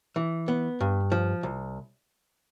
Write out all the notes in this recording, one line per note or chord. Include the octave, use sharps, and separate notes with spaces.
E3
B3
G2
F3
C2